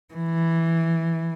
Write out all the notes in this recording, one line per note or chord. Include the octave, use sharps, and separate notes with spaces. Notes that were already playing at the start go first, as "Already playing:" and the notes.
E3